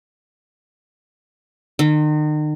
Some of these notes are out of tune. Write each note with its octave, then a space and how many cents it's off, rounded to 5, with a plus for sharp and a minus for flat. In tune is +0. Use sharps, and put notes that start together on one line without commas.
D#3 -40